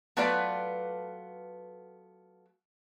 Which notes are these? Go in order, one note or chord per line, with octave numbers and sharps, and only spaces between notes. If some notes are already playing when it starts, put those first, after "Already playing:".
F#3 A3 B3 F4 B4 D5